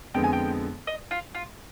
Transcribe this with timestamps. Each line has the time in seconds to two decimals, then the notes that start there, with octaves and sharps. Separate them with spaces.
0.14 F2 D3 G#3 B3 G5
0.24 G#5
0.33 G5
0.87 D#5
1.11 F4
1.35 F4